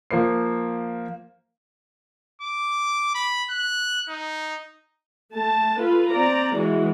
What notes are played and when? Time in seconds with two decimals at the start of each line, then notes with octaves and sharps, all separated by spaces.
0.11 F3 A#3 C5 C7
2.42 D6
3.15 B5
3.50 F#6
4.09 D#4
5.32 A3 A5
5.79 F4 A4 B4
6.11 C4 D5 A#5
6.55 E3 G#3 F#4